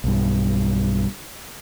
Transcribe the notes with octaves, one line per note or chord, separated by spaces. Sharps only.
B1 G2